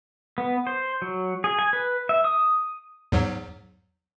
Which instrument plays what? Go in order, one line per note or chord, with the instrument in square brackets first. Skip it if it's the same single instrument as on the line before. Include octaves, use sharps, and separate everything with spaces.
[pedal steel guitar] B3
C5
F#3
G#4
G#5
B4
E5
D#6
[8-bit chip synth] E2 G#2 F#3